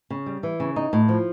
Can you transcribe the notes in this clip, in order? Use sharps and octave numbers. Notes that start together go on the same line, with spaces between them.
C#3
G3
E3
C#3
D#4
A2
F3